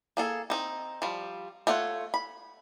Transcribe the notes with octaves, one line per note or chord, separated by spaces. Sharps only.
A#3 G#4 A4
C4 D#4
F3 G3
A3 F4 C#5 F#5
B5